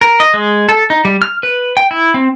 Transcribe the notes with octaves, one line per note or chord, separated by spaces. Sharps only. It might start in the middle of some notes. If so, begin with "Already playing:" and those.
A#4
D#5
G#3
A4
D#4
G3
F6
B4
G5
E4
C4